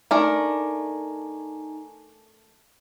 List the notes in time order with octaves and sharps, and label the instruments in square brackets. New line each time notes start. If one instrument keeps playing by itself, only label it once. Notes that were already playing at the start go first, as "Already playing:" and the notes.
[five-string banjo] A3 D4 A#4 [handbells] D#4 G#5